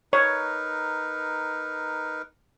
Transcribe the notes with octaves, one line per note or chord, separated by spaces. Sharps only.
D#4 A#4 B4 C#5